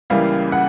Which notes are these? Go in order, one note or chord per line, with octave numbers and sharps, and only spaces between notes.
C#2 C#3 E3 G3 A#3 F5
F#5